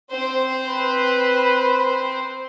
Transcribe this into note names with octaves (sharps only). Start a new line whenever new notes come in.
C4 C5
B4